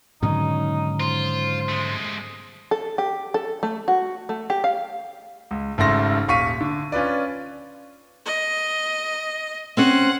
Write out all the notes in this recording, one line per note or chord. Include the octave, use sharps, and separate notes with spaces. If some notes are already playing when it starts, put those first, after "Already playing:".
G#2 B2 D3 D#3 F#3 C#4 D#4
F4 C5
G#3 A3
A4
G4
A4
A3
F#4
A3
G4
F5
C#2
G#1 C#3 A3 C6 A#6
D#1 F5 C#6 B6 D#7
D3
C#4 F4 B4 D5
D#5
C4 C#4 C5 F#5